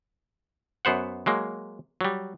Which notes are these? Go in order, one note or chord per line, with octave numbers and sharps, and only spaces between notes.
F#2 B3 C5 F#5
F#3 G#3 A#3
F#3 G3